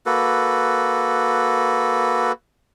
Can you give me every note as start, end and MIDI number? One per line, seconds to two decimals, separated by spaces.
0.06 2.32 58
0.06 2.32 66
0.06 2.32 69
0.06 2.32 71